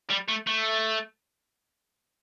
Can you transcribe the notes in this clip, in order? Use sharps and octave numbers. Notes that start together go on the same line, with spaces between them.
G3
A3
A3